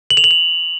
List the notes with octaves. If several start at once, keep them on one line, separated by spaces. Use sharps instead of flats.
F#7
F7
F#7
F7